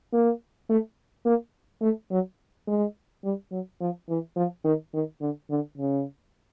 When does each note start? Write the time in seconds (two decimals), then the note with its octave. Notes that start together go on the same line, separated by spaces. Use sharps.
0.13 A#3
0.69 A3
1.26 A#3
1.82 A3
2.11 F#3
2.68 G#3
3.24 G3
3.51 F#3
3.81 F3
4.09 E3
4.36 F3
4.65 D#3
4.94 D#3
5.21 D3
5.50 D3
5.78 C#3